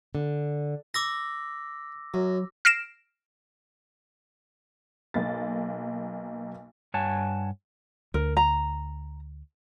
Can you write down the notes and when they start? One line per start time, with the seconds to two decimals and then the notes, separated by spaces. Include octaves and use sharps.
0.15 D3
0.94 B5 D6 E6 A#6
2.14 F#2 F#3
2.65 F6 A#6 C7 D7 E7
5.14 B1 A#3 A6
6.94 G2 C#5 F#5 G#5 A5
8.14 D2 A#4
8.37 A#5